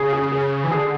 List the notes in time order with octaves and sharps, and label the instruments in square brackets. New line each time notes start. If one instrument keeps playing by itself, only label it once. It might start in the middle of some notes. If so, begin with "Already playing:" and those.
Already playing: [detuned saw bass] C#3 [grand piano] G#4
[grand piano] G#4
G#4
[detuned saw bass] E3
[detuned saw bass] D3 [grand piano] G#4